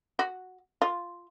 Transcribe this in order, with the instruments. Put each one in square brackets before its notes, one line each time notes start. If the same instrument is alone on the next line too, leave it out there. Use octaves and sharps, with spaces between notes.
[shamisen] F#4
F4